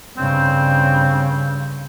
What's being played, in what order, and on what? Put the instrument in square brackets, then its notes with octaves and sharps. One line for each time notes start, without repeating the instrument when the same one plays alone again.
[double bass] G2 C#3 [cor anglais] C4